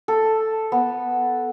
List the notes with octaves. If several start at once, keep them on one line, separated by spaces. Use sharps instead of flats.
A4
B3